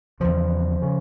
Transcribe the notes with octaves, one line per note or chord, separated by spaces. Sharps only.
E2 C#3 F3
C#3